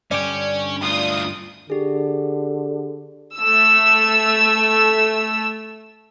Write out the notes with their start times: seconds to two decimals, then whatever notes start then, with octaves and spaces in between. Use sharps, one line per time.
0.11 G2 D3 C#4 G4 D5
0.82 D2 F4 D#6
1.70 D3 G4 G#4
3.39 A3 E6